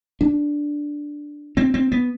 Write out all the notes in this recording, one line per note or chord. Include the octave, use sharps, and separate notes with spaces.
D4
C4
C4
B3